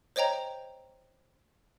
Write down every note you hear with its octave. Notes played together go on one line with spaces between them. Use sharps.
C5 C#5 D#5 G5 A#5